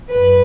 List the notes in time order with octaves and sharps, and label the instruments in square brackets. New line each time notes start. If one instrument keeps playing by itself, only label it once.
[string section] F#2 B4